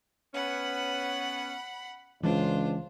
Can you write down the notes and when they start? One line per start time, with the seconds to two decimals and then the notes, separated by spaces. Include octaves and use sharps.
0.34 B3 C#4 F#5 B5
2.23 C#2 E3 G#3 C#4 D4 F4 C5